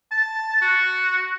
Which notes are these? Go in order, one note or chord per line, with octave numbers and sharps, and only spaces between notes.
A5
F#4